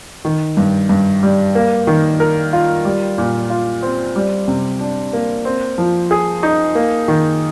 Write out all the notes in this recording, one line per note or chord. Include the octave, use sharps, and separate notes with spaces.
D#3
G2
G2
G3
A#3
D#3
A#4
F4
G3
A#2
F4
C4
G3
C3
D4
A#3
C4
F3
G#4
D#4
A#3
D#3